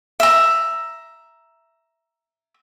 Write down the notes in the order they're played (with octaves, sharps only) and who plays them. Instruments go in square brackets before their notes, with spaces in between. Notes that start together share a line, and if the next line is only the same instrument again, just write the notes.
[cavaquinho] E5 A#5